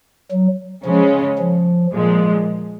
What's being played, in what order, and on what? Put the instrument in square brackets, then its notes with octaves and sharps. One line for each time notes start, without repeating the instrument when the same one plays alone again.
[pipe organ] F#3
[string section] C#3 G#3 C#4 [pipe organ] F3
[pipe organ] F3
[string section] A#2 F3 G#3